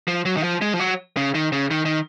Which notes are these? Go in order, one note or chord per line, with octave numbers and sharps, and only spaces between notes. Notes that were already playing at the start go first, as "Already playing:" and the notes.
F3
F#3
D#3
F3
G#3
F3
F#3
C#3
D#3
C#3
D#3
D#3